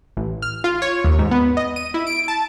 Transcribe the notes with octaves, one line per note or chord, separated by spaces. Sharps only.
A1
F6
F4
C#5
D#2
G#2
B3
D#5
D#7
E4
D7
A5